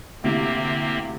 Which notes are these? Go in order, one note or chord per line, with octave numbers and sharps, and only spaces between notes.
D2 A2 C3 A#3 C4 G4